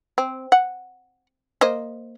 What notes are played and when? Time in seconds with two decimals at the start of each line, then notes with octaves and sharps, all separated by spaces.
0.18 C4
0.52 F#5
1.61 A#3 C5 D#5